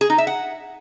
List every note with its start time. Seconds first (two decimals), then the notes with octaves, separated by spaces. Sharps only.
0.01 G#4
0.10 D#4
0.18 E5
0.27 F#5